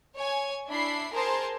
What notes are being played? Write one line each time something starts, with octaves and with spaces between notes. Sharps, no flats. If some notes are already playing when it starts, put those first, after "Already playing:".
C#5 G#5
D4 E4 B5 C7
G#4 A#4 C5 A5 A#5 C6